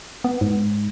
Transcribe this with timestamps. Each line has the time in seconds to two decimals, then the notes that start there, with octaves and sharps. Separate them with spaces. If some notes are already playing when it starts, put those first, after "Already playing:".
0.24 B3
0.41 G#2